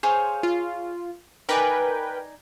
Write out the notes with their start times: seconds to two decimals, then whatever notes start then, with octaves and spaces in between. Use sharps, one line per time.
0.03 G#4 C5 C#5 F5
0.43 F4
1.49 D#4 A#4 B4 D5 G5 G#5